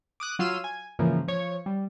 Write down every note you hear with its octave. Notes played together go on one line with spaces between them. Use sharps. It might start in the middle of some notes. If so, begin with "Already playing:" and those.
D6 D#6 F#6
F#3 F4 F5 C6 E6 D#7
G#5
G#2 C#3 E3 F3 A#3
F3 C#5
G3